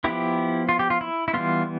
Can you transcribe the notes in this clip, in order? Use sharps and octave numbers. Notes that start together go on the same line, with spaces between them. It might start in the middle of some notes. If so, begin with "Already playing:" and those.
F3 B3 E4 G4
F4
G4
F4
E4
E4
E3 G3 B3 F4